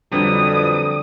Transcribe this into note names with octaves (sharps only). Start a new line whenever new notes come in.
F2 D3 F#3 G3 B4 D5 G5 D#6